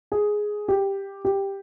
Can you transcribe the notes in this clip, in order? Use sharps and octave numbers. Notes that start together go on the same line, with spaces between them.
G#4
G4
G4